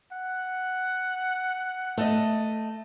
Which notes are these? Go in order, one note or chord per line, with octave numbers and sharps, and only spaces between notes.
F#5
A3 D#5